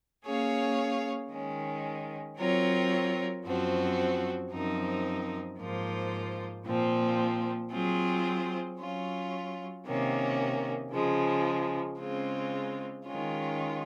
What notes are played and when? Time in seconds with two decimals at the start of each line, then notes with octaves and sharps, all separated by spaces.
0.25 A#3 C#4 G#4 C#5 F5
1.31 D#3 G#3 C#4
2.38 F#3 C4 F4 A#4 C#5
3.45 F#2 F3 C4 F#4
4.51 F#2 F3 C4 D#4 A#4
5.59 G#2 F3 A#3 F4 C5
6.65 A#2 F3 C4
7.72 F#3 C4 F4 G#4 C5
8.79 F#3 C#4 F4
9.86 C3 D#3 A#3 C#4
10.93 C#3 F3 G#3
11.99 C#3 G#3 C4 F4
13.06 D#3 G#3 C#4 F4